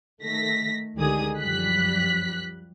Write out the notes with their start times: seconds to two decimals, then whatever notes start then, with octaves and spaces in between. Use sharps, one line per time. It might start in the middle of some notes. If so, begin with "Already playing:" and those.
0.23 D#3 A3 A#6 B6
0.96 C#2 D3 D#3 G4 G#4 D#6
1.39 F#2 F3 G3 F#6 B6